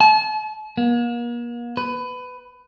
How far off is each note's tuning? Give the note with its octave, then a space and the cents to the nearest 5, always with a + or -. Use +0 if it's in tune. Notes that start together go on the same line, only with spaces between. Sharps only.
A5 -40
A#3 +40
B4 +20